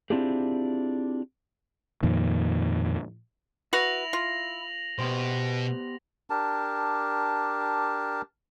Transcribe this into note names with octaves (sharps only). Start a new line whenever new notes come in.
C4 D4 E4 F4 G4 G#4
F2 A#2 D#3
E4 F#4 B4 A#6 F7 F#7
F4
B2 B3 G4 C5
D4 G4 A#4 A5